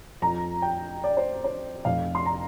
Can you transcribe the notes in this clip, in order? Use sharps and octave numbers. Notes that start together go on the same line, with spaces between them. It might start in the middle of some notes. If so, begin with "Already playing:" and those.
F2 F3 A#5
G5
D5
C5
C5
F1 F2 F3 F5
C6
A#5